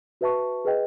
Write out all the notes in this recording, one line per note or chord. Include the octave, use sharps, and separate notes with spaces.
F#4 B4 E5 A5 C#6
G#4 B4 D#5 G5